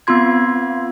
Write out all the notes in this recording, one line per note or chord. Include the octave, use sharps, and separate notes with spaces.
B3 C4 F4 C6 G#6